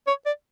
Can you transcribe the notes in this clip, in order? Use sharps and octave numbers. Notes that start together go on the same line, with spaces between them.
C#5
D5